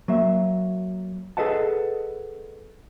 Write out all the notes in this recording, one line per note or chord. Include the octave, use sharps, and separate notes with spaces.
F#3 A#3 E5
G#4 A4 B4 D#5 F#5 A5